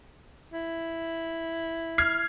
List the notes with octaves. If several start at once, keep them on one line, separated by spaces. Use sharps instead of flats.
E4
F6 G#6 C7